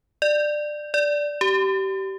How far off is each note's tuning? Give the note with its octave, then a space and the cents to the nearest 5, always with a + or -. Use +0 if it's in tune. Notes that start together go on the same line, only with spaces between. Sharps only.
D5 +20
D5 -5
G4 -25